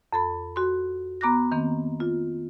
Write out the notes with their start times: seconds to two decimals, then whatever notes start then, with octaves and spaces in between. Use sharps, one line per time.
0.13 F2 A4 B5
0.56 F#4 C6
1.21 B3 A#5 D6 F#6 A#6
1.52 D#3 A#3 C4
2.00 F4